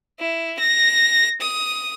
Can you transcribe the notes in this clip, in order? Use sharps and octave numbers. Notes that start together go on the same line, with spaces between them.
E4
A#6
D#6